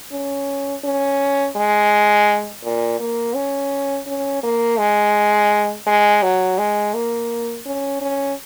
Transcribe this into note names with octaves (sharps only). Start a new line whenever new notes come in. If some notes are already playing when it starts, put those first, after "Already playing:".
C#4
C#4
G#3
A#2
A#3
C#4
C#4
A#3
G#3
G#3
F#3
G#3
A#3
C#4
C#4